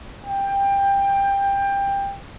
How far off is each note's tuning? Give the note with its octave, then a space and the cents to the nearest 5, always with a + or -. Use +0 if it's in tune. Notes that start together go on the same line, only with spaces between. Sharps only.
G5 +20